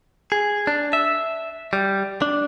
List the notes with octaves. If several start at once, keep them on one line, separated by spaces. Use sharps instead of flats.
G#4
D4
E5
G3
D4